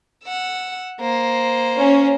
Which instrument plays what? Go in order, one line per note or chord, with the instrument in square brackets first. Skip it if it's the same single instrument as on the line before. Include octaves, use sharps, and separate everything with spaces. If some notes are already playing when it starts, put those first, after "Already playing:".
[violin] F#5 E6
A#3 C5
[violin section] C#4